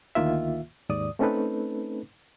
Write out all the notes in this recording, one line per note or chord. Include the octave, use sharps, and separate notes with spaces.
D2 D#3 A#3 F4 E5
D#2 G#2 D5 D#6
A3 C4 C#4 D#4 A4 B4